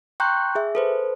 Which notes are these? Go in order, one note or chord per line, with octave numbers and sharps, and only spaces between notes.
G5 A#5 C6 C#6 F#6 G6
G#4 E5
A4 B4 C5